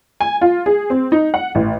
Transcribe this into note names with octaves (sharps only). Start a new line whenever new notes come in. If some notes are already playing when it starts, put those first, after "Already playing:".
G#5
F4
G#4
C4
D#4
F#5
A1